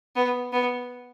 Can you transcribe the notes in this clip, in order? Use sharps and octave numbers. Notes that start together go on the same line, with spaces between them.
B3
B3